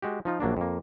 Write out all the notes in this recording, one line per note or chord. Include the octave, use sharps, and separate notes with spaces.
G#3 F#4 G4
F3 D#4 F4
A#1 F#3 A#3 D4
F2 A#3